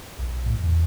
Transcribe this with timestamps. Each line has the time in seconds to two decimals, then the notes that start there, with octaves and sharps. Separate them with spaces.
0.19 B1
0.46 A2
0.60 E2